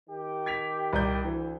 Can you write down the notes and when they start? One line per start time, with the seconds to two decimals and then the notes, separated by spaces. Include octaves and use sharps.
0.10 D#3 G4
0.46 G#6 B6 F7
0.93 C2 D5 G6
1.25 D2 E3